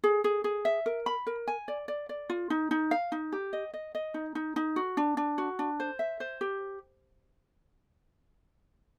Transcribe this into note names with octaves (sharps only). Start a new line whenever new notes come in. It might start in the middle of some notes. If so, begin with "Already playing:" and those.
G#4
G#4
G#4
E5
A#4
B5
A#4
G#5
D5
D5
D5
F4
D#4
D#4
F5
D#4
G4
D#5
D#5
D#5
D#4
D#4
D#4
F#4
D4
D4
F#4
D4
C5
E5
C5
G4